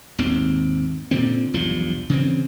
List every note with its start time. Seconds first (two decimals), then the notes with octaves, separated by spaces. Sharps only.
0.18 G#1 D#2 C4
1.11 A#2 D3 C4
1.54 B1 E2 G2 F3
2.09 C#3 E3 C4